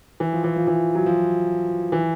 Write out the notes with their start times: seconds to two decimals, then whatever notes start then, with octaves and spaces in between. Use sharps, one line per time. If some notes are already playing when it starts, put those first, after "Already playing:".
0.20 E3
0.33 F3
0.44 E3
0.56 F3
0.67 E3
0.95 F#3
1.06 F3
1.92 E3